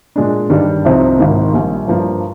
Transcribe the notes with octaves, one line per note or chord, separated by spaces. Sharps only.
A#2 G#3 D4
G2 D#3 G3 D4
C2 C3 F3 C4 D#4
G#1 G#2 D#3 A#3
A#1 A#2 G3
G2 F3 A#3